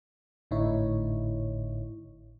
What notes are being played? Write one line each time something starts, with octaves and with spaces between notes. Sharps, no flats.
G#1 A2 D3 D#4 E4 C#5